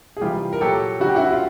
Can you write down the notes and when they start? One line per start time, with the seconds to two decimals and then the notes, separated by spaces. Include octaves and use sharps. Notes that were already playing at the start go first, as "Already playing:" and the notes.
0.17 G#4
0.21 C3 E3 G3 F4 G4
0.53 A#4
0.61 A#2 F#3 G4 A4
1.00 C#3 F#3 F#4
1.09 G4
1.16 E4 F#4
1.32 F4